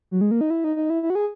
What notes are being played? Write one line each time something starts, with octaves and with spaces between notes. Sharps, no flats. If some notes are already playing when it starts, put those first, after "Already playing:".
F#3
G#3
A#3
D#4
E4
D#4
D#4
E4
E4
F#4
G#4